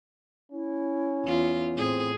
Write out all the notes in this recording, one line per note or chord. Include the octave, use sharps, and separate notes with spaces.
C#4 E4
E2 F4
A2 C4 G#4